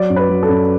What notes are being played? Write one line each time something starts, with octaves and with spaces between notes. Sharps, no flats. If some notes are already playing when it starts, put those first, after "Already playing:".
Already playing: F#3 D5
F#2
B4
F#3
A4
F#2